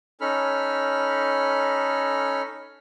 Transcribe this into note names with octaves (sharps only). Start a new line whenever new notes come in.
C#4 D#4 A4 B5 F6